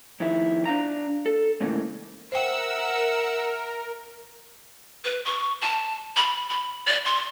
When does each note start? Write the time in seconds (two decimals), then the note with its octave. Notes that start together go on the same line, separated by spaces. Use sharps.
0.20 F2 D#3 E4
0.65 D4 F5 A#5
1.26 A4
1.61 G#2 C#3 E3 A3 A#3
2.32 A#4 C5 E5 F#5 G5 E6
5.05 B4
5.25 C#6
5.62 A5
6.17 B5
6.49 B5
6.87 D5
7.05 C6